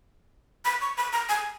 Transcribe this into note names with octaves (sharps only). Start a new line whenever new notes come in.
B5
C#6
B5
A#5
G#5